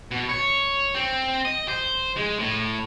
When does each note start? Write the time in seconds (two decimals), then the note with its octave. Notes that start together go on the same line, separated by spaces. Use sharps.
0.11 B2
0.29 C#5
0.95 C4
1.45 D#5
1.68 C5
2.17 G#3
2.39 A2